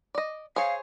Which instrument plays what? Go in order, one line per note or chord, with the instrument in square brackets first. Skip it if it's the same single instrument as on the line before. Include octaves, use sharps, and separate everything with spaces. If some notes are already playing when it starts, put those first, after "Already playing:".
[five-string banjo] D5 D#5
[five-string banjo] G#4 C5 C#5 [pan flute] F5